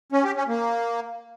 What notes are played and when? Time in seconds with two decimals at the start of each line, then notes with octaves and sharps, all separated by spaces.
0.12 C#4
0.24 G4
0.36 C#4
0.48 A#3